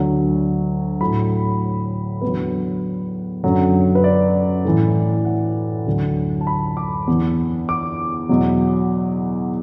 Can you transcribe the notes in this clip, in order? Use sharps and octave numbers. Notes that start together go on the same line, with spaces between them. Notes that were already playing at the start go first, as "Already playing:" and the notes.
Already playing: D2 D3 F#3
A2 F#3 B5
E2 D3 F#3 B4
F#2 D3 F#3
B4
D5
A2 E3
F#5
D2 D3 F#3
A5
B5
D6
E2 E3
D6
E2 B2 F#3